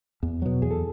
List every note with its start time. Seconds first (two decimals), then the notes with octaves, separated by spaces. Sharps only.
0.23 E2
0.42 B2 F#3
0.62 E2 G#4
0.71 A4